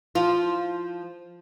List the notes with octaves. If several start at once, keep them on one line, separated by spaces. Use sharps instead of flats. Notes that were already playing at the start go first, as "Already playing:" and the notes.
F3 F4